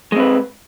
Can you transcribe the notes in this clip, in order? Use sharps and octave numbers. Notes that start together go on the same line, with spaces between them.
G#3 C4 B4